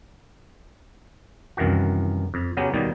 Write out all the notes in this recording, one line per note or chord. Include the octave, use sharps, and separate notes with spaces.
C2 F#2 D#3 E3 F#4
F2
C#3 F#3 B3 C#4 G4
D#2 B2 D#3 G3 A#3 D#4